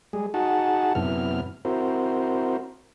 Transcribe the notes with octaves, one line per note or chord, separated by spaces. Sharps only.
G3 G#3 G#4
D#4 F#4 G#4 F#5 A5
F#2 C3 B3 E4 F6
C4 E4 F#4 A#4 C5